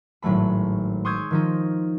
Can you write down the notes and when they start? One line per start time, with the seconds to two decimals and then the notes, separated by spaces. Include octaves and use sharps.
0.22 G#1 A2 F#3 A3 B5
1.05 C6 C#6 D#6 E6 G6 G#6
1.31 D#3 F3 D#4